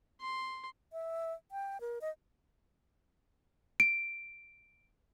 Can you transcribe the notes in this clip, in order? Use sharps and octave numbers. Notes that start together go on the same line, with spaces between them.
C6
E5
G5
A#4
D#5
D7